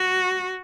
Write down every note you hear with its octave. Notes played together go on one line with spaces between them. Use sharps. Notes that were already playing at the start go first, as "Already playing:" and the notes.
Already playing: F#4